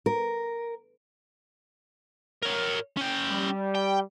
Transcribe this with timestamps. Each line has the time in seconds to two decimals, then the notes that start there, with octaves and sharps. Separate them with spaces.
0.06 A#4
2.43 A#4 C#5
2.97 C#4 G5
3.30 G3
3.75 G5